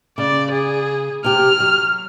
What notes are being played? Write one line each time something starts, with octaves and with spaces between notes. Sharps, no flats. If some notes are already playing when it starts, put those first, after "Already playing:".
C#3 D5
G#4
C3 G4 F6
F#3